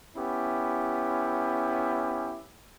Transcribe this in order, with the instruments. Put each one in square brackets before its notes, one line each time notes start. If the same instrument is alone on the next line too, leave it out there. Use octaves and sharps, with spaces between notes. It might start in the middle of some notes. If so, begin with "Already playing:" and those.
[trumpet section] B3 C#4 E4 G4